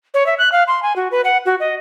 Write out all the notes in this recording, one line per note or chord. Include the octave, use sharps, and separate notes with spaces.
C#5
E5
F#6
F5
C6
G#5
F#4
B4
F#5
F#4
D#5